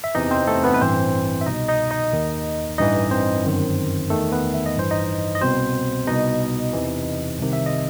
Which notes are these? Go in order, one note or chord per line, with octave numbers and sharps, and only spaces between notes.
E5
E2 C3 E3 D#4 D#5
C4 C5
A3 A4
B3 B4
B4
A1 G2 E3 C4 C5
E5
C2 B2 D#4 D#5
D#4 D#5
D#4 D#5
D#2 D#3
A1 G2 E3 D#4 D#5
C4 C5
G1 F#2 D#3
E2 D#3 A3 A4
B3 B4
E5
D#5
A1 G2 E3 C5
D#4 D#5
D#5
C2 B2 C4 C5
C2 B2 D#4 D#5
E2 C3 E3
C2 C3 D#3
E5
D#5